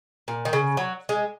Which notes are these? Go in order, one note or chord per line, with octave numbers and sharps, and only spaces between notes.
A#2
D#3
C#3
F#3
G#3